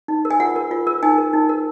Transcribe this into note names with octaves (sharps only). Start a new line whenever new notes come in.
D#4
A#4
G#5
F4 F#5
A#4
F4
A#4
D#4 G#5
A#4
D#4
A#4